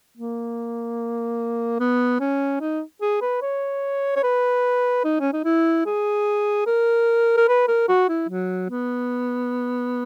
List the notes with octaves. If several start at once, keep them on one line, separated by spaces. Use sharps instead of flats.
A#3
B3
C#4
D#4
G#4
B4
C#5
C#5
B4
D#4
C#4
D#4
E4
G#4
A#4
A#4
B4
A#4
F#4
E4
F#3
B3